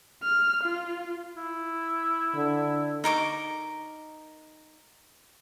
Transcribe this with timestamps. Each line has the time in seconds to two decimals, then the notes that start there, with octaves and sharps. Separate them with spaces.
0.23 F6
0.64 F4
1.36 E4
2.35 D3
3.04 D#4 A#4 C#6 D6